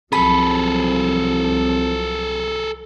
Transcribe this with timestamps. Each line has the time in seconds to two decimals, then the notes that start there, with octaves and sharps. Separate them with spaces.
0.12 C2 F3 F#3 C4 G#4 A4 B5